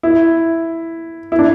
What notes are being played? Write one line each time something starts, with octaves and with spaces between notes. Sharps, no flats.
E4
E4
D4